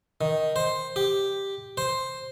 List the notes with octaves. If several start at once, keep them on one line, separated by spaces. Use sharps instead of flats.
D#3
C5
G4
C5